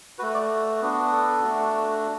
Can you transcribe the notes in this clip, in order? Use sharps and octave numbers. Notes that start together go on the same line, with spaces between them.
A3 F#4 B4
D5
B3 D4 F#4
A4
A3 D4 F#4